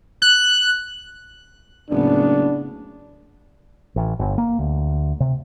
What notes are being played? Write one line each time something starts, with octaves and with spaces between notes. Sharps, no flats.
F#6
F#1 A2 C#3 B3 D4
A1
G1
A#3
D2
C3